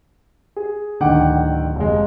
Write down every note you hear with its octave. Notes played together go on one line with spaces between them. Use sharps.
G#4
D1 D3 D#3 F#5 G5 D6
F1 G#3